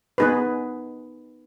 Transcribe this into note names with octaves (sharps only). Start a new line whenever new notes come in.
B3 D#4 G#4 B4